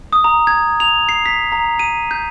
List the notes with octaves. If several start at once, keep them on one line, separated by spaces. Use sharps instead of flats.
D#6
A#5
G#6
F7
C7
B6
A#5
D#7
G6